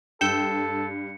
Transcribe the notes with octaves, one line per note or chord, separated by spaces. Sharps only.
G2 A4 G5 E6 G6 C#7